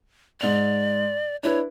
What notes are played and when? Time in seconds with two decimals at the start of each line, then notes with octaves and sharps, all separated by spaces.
0.41 G#2 D5 F7
1.43 D4 E4 B4 C#5